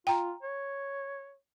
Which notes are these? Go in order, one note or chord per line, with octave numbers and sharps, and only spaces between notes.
F4 G5 A#5
C#5